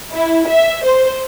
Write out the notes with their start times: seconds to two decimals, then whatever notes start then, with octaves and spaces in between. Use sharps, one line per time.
0.12 E4
0.48 E5
0.85 C5